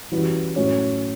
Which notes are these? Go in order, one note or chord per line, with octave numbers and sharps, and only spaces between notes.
E3 G3 C#4 F#4 B4
A2 F#3 C#4 F#4 C#5